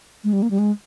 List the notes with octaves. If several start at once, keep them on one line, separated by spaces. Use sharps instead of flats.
G#3
G3
A#3
G3
G#3